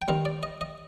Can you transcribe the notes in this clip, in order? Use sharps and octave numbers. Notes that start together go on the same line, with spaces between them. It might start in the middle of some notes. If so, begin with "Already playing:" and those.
G5
D#3 G3 C4 F5
D5
D#5
D#5